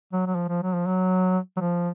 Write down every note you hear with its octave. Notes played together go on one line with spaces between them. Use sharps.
F#3
F#3
F3
F3
F#3
F3
F#3
F#3
F3